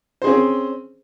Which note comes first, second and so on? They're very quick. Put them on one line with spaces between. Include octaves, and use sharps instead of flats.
C5 G#4 C#4 C4